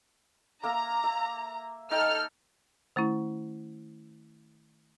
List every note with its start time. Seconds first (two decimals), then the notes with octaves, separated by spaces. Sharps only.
0.63 A#3 A#4 E5 A#5
1.04 E5
1.91 D#4 A4 G5 F6
2.96 D#3 A3 C#4 E4